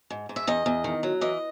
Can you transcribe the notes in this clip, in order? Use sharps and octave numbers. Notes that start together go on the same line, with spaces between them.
G#2
G#2
E5
E2 D#5
E2
D#3
F#3
E3 D#5